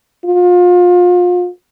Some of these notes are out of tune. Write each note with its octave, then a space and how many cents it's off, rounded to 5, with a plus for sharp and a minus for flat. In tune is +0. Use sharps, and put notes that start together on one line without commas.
F4 +30